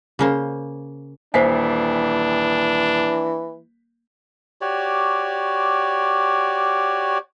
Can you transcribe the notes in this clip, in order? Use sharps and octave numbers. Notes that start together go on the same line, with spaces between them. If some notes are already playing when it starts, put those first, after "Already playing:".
C#3 A#3 C5
D#1 E3 D4 C5 E5 G#5 B6 C7
F#4 G4 C#5 D5